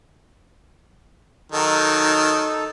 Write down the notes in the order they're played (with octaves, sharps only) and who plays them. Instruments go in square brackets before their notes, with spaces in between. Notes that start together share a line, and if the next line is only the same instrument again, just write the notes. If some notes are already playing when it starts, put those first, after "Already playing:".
[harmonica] D#3 F#3 [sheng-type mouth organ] D#4 A4